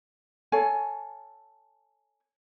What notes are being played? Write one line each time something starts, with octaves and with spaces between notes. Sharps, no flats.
A4 C#5 F5 G#5